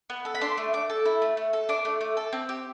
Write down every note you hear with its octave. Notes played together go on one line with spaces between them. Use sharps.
B3
A4
B5
D4 C6
A3
A3 D6
A4
E4
A3
A3
A4
D4 D6
A3
A3
A4
C4
G4